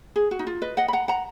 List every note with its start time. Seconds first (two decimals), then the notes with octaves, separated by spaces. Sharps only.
0.16 G#4
0.31 F#4
0.39 D#4
0.47 F4
0.62 B4 D#5
0.77 D#5 F#5
0.88 B5
0.93 F#5 A#5
1.08 F#5 A#5